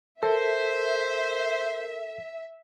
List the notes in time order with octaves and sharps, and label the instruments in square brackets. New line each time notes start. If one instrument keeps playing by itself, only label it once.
[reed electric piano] A4 [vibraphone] A#4 [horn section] C5 [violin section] E5